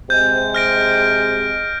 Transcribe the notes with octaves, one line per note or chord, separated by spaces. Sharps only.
C3 G#3 G6
F6 A#6 D7